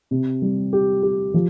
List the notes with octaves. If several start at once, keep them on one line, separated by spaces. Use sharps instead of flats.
C3
G3
G4
G4
F3